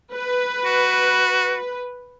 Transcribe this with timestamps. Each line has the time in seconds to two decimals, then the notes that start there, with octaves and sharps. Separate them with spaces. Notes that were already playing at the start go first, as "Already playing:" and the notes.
0.14 B4
0.65 F#4